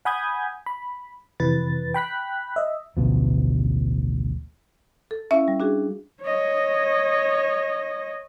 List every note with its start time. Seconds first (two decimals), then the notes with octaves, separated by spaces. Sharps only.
0.05 F#5 G#5 B5 D#6 G6 G#6
0.66 B5
1.40 F2 C3 E3 B4 A6
1.94 G5 B5 F#6 B6
2.56 D#5 E5
2.97 A1 D2 B2 F3
5.11 A4
5.31 C#4 E4 E5 F5
5.48 G3
5.60 D4 F#4 G#4
6.22 C#5 D#5